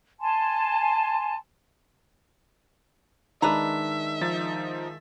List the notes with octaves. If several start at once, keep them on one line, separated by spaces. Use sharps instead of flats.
G#5 A5 C6
D#3 G#3 D4 B4 E5 A#5
F3 D#4 A6